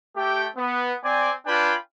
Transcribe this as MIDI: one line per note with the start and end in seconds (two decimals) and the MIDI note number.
0.16 0.46 57
0.16 0.46 67
0.16 0.46 79
0.56 0.94 59
1.04 1.31 60
1.04 1.31 74
1.04 1.31 80
1.46 1.75 62
1.46 1.75 65
1.46 1.75 71
1.46 1.75 79
1.46 1.75 80
1.46 1.75 83